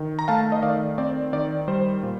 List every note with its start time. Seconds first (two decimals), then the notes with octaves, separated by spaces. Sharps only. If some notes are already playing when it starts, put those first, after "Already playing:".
Already playing: D#3
0.19 A#5
0.28 A3 F5 A5
0.52 D#5
0.63 D#3 D5 F5
0.98 C4 D5
1.33 D#3 D5
1.68 G3 C5
2.03 A#2